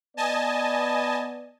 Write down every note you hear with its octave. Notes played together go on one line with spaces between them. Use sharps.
B3 D5 D#5 G#5 A5